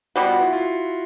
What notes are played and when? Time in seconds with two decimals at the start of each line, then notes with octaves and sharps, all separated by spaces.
0.16 B2 G3 B3 F#4
0.28 F4
0.41 E4
0.53 F4